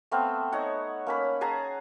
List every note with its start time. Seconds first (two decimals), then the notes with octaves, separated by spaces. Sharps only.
0.11 A3 B3 C4 F5
0.52 D#4 C#5 F#5
1.07 A#3 C#4 B5
1.41 G#4 F#5 A5 A#5